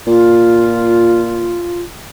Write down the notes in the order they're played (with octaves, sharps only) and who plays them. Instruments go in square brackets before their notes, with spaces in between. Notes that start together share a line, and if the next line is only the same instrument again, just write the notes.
[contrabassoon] A#2 [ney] F4